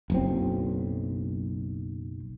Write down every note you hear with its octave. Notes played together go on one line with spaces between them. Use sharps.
F#1 B1 C4